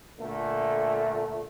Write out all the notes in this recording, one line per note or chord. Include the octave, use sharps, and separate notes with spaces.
A#2 D3 A3